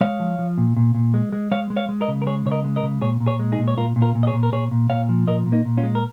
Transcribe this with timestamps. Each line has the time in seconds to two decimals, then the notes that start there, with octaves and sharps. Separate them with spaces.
0.01 G#3 C#5 F5
0.20 F3
0.39 F3
0.58 A#2
0.77 A#2
0.95 A#2
1.14 G#3
1.32 G#3
1.51 G#3 C#5 F5
1.70 G#3
1.76 C#5 F5
1.89 G#3
2.01 A#4 D#5
2.08 C#3
2.22 A#4
2.27 G#3 G#4 C#5
2.46 C#3 C#5
2.51 A#4 D#5
2.64 G#3
2.76 A#4 D#5
2.83 C#3
3.01 A#2 G#4 C#5
3.20 A#2
3.26 G#4 C#5
3.39 G#3
3.52 D#4 G#4
3.59 A#2
3.68 C#5
3.77 A#2 F4 A#4
3.96 A#2
4.02 F4 A#4
4.15 A#2
4.23 D#5
4.27 G#4 C#5
4.33 A#2
4.43 A#4
4.52 A#2 G#4 C#5
4.71 A#2
4.90 A#2 C#5 F5
5.09 F3
5.27 A#2 A#4 D#5
5.46 A#2
5.52 A#3 D#4
5.65 A#2
5.77 C#4 F4
5.83 G#3
5.95 A#4